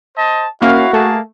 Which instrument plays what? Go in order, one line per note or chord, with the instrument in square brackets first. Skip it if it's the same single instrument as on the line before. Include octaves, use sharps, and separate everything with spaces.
[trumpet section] C5 D#5 A5
[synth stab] A#3 C#4 [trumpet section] E4 F5 [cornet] F#4
[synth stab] A3 [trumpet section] A#3 G#4 A5